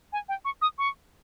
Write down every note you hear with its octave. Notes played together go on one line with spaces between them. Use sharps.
G#5
G5
C#6
D#6
C#6